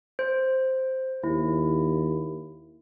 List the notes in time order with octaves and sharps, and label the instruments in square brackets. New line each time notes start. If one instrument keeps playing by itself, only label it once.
[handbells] C5
[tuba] D#2 [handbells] E4